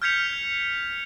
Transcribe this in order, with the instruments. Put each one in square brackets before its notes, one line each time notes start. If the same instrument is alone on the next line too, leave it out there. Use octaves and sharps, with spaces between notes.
[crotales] F6 G6 G#6 B6 C#7 F7